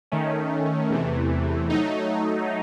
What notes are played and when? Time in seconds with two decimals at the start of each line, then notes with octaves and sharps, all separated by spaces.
0.12 D#3 A3 C#4
0.90 E2 C3 E3 A3
1.70 F#3 A3 D#4